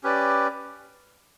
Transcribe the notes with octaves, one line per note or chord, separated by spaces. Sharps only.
C#4 G4 B4 D5